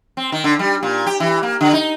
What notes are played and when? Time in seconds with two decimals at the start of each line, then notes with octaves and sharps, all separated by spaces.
0.17 C4
0.32 D#3
0.44 D3
0.59 G3
0.83 A#2
1.06 G4
1.20 E3
1.43 A#3
1.61 D3
1.73 D#4